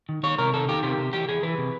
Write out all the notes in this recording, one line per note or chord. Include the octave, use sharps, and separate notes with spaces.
D#3
D#3 C#5
C3 A#4
D#3 A4
D#3 G4
C3 G4
C3
E3 G4
E3 G#4
E3 B4
C3